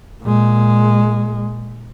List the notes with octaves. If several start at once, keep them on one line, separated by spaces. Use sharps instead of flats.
A#2 G#3